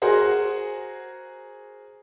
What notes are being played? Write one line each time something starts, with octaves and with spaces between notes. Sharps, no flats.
F#4 G#4 A#4 C5 F#5